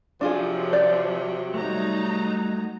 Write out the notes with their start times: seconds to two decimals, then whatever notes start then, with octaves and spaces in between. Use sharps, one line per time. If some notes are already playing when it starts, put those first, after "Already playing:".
0.21 C3 F3 F#3 D4 F4 G#4
0.73 D5 G6
1.54 F#3 G3 A3 D#4 A#5